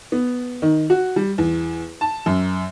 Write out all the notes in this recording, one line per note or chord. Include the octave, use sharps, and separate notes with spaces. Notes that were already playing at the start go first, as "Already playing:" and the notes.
B3
D#3
F#4
G3
E2
A5
F#2